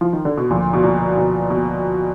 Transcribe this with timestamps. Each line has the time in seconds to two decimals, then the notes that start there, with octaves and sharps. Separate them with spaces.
0.01 F3
0.13 D#3
0.25 D3
0.37 B2
0.50 D2 A#2 D3 F3
0.73 B2
0.83 A#2
1.17 B2
1.50 B2